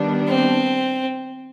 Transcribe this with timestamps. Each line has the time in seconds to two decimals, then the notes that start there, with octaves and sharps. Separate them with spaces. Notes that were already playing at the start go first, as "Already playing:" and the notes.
Already playing: D#3 G3 B3 D4
0.28 C4